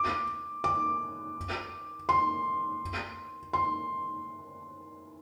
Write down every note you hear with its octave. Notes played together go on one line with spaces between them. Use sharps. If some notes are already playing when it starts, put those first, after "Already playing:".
Already playing: D6
D6
C6
C6